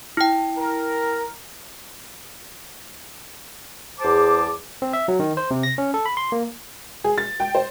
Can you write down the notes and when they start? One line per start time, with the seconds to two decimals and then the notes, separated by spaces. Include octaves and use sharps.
0.17 E4 G5
0.58 A#4
4.00 E2 G#4 C5 A5 D6
4.82 C4
4.93 E5
5.08 F#3
5.20 D#3
5.37 C5
5.51 C3
5.63 A#6
5.78 C#4
5.94 A4
6.06 B5
6.17 C6
6.32 A#3
7.04 G#4
7.18 A6
7.40 G5
7.55 C5